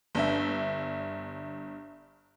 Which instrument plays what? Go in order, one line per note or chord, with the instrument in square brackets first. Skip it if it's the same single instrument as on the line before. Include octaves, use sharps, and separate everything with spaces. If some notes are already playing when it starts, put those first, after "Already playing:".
[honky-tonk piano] G1 D4 E5